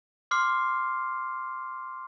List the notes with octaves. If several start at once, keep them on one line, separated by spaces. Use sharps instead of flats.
C6 D6 F6 C7